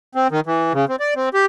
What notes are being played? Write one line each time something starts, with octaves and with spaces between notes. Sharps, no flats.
C4
D#3
E3
C#3
C4
D5
C4
G4